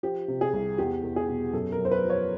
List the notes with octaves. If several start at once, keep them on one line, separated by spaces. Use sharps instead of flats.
F3 G4
C3
G#4
C2
E2 G4
E2
G#4
B2
F#2 A4
A#4
F#2
C5
B4
F3
C#5